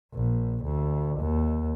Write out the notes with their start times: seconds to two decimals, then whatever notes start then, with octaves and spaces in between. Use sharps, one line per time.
0.14 A#1
0.64 D2
1.20 D#2